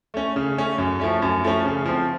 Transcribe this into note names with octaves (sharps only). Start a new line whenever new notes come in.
A3 C#4
C#3
A3 C#4
F#2
F3 A3 C#4
F#2
F3 A3 C#4
C#3
F3 C4